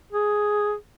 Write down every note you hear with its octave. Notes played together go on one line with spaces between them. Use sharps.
G#4